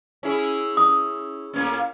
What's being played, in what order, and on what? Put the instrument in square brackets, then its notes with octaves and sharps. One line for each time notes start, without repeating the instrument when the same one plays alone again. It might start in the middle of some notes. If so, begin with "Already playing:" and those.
[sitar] C#4 E4 G#4
[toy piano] D#6
[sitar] A2 A#3 C#4